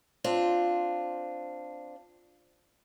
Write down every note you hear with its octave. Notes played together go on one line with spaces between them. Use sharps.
C4 D4 F4